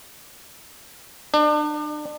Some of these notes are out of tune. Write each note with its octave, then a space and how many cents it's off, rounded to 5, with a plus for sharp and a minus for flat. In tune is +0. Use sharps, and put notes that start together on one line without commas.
D4 +35